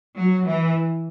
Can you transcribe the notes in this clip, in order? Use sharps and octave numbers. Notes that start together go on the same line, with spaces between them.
F#3
E3